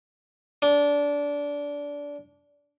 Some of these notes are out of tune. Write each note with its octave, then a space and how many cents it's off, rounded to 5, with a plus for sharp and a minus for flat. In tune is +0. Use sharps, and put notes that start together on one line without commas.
D4 -20